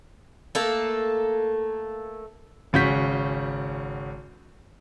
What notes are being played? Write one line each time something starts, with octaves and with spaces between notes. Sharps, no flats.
A3 A#3 A4
G#1 C#3 F#4 G6 B6